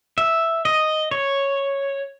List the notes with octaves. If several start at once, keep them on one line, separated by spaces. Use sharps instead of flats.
E5
D#5
C#5